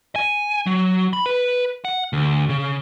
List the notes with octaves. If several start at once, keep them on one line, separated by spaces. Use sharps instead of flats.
G#5
F#3
B5
B4
F#5
D2
C#3